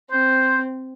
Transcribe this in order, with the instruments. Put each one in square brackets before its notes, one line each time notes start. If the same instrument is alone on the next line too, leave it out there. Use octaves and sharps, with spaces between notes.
[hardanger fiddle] C4 [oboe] C5